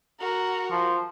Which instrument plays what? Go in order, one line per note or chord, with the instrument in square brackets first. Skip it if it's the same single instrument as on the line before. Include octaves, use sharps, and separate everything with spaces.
[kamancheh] F#4 A#4
[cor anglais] F3